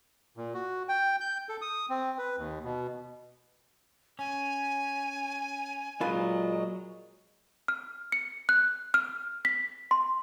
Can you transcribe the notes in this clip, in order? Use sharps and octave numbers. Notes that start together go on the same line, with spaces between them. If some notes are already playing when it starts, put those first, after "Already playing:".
A#2
F#4
G5
G6
A4
D#6
C4
B4
D#2
B2
C#4 G#5
A#2 F#3 G#3 F4 B4 D#5
F6
C#7
F#6
F6
B6
C6